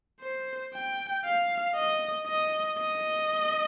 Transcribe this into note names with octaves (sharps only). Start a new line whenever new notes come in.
C5
G5
F5
D#5
D#5
D#5